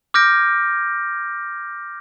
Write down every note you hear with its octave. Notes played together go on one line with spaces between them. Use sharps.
D6 F6 G6 A#6 D7